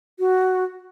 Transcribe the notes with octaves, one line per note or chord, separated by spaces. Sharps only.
F#4